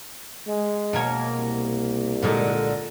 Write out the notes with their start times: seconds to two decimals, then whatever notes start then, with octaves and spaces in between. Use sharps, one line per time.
0.47 G#3
0.93 B2 A#3 C#5
1.36 C2
2.23 A#2 D3 G#3